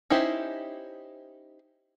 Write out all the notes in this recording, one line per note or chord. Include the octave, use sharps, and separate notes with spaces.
C#4 D#4 E4 G4 C5